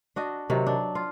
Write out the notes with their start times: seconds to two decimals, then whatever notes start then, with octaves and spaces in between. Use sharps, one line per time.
0.16 D4 F#4 D#5
0.50 C3 D#3 F#3
0.67 D4
0.95 F4